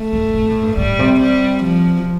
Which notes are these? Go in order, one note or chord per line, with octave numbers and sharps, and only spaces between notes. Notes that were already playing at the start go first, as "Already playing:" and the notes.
Already playing: A3
G2
C3
A2
G2
A2 G3
C3
G3
F3